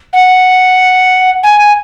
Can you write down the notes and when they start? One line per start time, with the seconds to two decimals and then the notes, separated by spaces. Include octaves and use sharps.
0.13 F#5
1.43 G#5